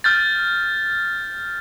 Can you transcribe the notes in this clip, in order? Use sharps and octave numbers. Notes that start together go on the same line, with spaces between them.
F6 G6 A6